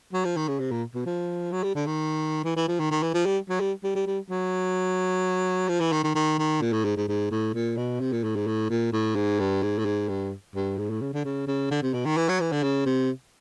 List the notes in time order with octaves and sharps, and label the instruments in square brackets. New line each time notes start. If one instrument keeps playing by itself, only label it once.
[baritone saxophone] F#3
F3
D#3
C#3
C3
A#2
B2
F3
F#3
G3
D3
D#3
E3
E3
F3
D#3
D#3
E3
F3
G3
F#3
G3
G3
G3
G3
F#3
F3
E3
D#3
D#3
D#3
D#3
A#2
A2
G#2
G#2
G#2
A2
A#2
B2
C3
A#2
A2
G#2
A2
A#2
A2
G#2
G2
G#2
A2
G#2
G2
G2
G#2
A2
C#3
D3
C#3
C#3
D3
C3
B2
D#3
E3
F#3
E3
D3
C#3
C3